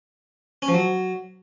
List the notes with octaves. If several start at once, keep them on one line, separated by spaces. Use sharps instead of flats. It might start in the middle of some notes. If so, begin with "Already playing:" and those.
C#4
F3
F#3